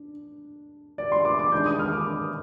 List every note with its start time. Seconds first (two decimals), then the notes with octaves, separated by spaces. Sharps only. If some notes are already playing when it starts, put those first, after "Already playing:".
Already playing: D4
0.98 D5
1.12 C6
1.25 D6
1.39 D6
1.52 D#3 G#3 D4 G6
1.66 D#6
1.79 F6
1.93 D6